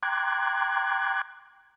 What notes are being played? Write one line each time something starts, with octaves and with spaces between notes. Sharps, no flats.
G5 A#5 C6 D6 F#6 G#6